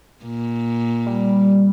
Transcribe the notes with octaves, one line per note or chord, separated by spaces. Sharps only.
A#2
G3